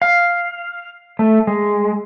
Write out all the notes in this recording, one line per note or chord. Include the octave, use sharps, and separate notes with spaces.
F5
A3
G#3